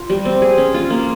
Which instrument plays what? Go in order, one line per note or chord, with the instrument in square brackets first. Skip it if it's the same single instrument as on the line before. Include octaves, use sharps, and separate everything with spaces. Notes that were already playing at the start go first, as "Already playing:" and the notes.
Already playing: [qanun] F4
G3
C4
G#4
C#4
F4
A#3